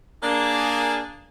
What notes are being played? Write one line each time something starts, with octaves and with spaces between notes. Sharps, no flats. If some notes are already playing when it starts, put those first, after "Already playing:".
A#3 D4 G#4